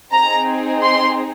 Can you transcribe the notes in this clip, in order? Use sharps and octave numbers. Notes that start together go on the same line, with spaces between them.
C4 D#4 G#4 A#5
C6